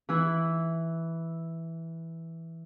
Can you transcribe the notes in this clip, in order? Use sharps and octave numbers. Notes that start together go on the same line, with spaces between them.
E3 E4